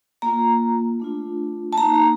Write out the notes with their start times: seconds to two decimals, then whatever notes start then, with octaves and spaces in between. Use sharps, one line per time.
0.22 A#3 F4 A#5
1.00 A3 D4 F4
1.73 A5
1.77 A#3 D#4 A#5